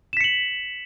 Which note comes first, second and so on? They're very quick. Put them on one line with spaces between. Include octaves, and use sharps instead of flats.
E7 B6 C#7 F#7